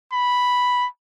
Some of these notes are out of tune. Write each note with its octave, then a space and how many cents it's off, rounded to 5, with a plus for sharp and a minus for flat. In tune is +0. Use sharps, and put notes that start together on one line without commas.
B5 +0